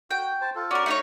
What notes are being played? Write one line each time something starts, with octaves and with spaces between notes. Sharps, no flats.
F#4 G5
C5 A5
F4 A4
C#4 F#4 A#4 D5
A3 D#4 C#5